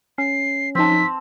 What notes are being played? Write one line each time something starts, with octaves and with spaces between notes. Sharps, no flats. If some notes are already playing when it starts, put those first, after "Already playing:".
C#4 C7
F3 C4 D#4 A5 B6